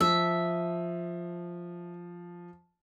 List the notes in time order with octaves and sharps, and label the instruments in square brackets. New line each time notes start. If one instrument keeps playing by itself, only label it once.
[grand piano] F3 [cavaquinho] E5